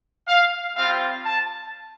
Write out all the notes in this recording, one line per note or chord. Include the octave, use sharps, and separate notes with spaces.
F5
G3 C4 F4 F5
A5